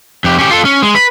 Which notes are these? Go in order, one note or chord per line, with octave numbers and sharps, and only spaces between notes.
F2 G4
C#4 G4
F4 A4
C#4
G#3
B4